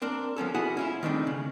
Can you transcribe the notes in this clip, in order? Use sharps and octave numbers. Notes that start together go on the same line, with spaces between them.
C4 D4 A#4
F3 B3 C#4 A4
E4 F#4 G#4 F#5
C#4 E4 F4
D#3 A3 C4 D4 D#4
C#3